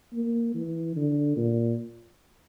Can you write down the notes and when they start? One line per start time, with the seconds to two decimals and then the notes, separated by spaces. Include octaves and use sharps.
0.13 A#3
0.55 E3
0.96 D3
1.37 A#2